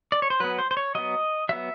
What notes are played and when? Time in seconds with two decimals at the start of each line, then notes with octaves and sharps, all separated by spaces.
0.12 D5
0.22 C#5
0.30 C5
0.40 F#3 B3 B4
0.58 C5
0.71 C5
0.77 C#5
0.95 F#3 B3 D#5
1.49 F#3 B3 E5